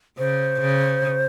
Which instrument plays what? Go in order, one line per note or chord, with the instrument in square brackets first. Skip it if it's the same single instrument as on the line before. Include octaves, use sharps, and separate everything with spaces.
[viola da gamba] C#3 [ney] C5
[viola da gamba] C#3